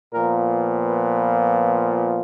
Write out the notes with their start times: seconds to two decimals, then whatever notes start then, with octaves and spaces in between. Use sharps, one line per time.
0.14 A#2 F3 B3 A#4
0.87 B4